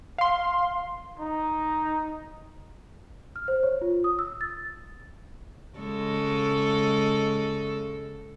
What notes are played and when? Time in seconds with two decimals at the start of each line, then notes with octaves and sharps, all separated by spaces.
0.18 F5 C6
1.20 D#4
3.36 F6
3.48 C5
3.63 C#5
3.81 F4
4.04 D#6
4.19 E6
4.41 A6
5.78 C#3 G#3 A4